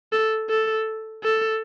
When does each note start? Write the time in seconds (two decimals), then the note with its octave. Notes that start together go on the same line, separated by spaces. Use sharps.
0.12 A4
0.49 A4
1.23 A4